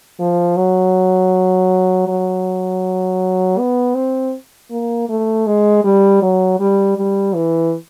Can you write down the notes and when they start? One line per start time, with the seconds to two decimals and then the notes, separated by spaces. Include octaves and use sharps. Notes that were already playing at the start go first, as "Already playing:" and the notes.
0.19 F3
0.56 F#3
2.08 F#3
3.58 B3
3.95 C4
4.71 A#3
5.09 A3
5.46 G#3
5.84 G3
6.22 F#3
6.59 G3
6.97 G3
7.35 E3